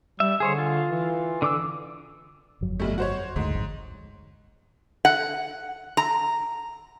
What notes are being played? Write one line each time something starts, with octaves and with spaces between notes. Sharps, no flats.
G3 E5
D3 G#4 C5 C#5
F4
E3
D3 D6 E6
G1 F2 F#3
B1 G3 A3
F#4 C5 C#5
F#1 D2 G#2 A3
G#1 F2
F#5
A#5